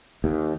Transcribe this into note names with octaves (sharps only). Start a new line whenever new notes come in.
D#2